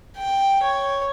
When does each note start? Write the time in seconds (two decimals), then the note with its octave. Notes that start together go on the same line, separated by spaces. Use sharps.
0.17 G5
0.63 C#5